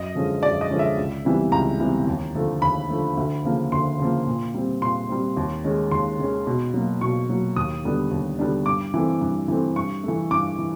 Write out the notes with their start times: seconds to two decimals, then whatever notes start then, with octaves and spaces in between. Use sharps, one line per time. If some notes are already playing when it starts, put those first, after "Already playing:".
Already playing: F#2 D#5
0.15 D3 F3 G#3 C#4
0.43 F#2 D5
0.61 D#5
0.70 D3 F3 G#3 C#4
0.79 E5
0.97 C#2
1.25 C3 E3 G3 B3
1.52 C#2 A#5
1.80 C3 E3 G3 B3
2.07 D#2
2.35 D3 F3 A3
2.62 D#2 B5
2.90 D3 F3 A3
3.17 D2
3.45 C#3 F3 A#3
3.72 D2 C6
3.99 C#3 F3 A#3
4.27 A#2
4.54 G3 C4
4.81 A#2 C6
5.09 G3 C4
5.37 D#2
5.64 D#3 G#3 C#4
5.91 D#2 C6
6.19 D#3 G#3 C#4
6.47 B2
6.74 F#3 A#3
7.01 B2 C#6
7.29 F#3 A#3
7.56 D#2 D#6
7.84 D3 G3 B3 D4
8.11 D#2
8.39 D3 G3 B3 D4
8.66 G2 D6
8.94 E3 A3 C4
9.21 G2
9.48 E3 A3 C4
9.76 G2 C#6
10.04 E3 A3
10.31 G2 D6
10.58 E3